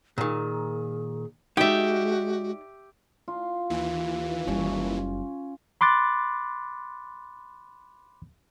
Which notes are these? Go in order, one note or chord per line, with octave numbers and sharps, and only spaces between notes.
A#2 D#3 G#4
G#3 D#4 F#4 G4 D5 E5
F4
D#2 E3
F#1 G3 C#4
B5 C6 D6 F#6 A6